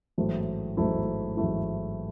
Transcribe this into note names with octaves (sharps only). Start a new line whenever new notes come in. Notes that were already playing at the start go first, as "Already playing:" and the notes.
A1 G#2 F#3 A3 E4
A1 G#2 F#3 A3 E4
A1 G#2 F#3 A3 E4